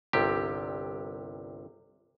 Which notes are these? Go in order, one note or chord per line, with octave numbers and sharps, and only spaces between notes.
G1 C2 C3 G4